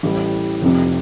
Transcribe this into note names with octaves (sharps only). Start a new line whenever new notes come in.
A1 A2 G3
F1 F2 C3